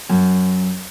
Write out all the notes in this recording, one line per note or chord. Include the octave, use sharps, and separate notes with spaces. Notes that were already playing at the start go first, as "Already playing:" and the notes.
F#2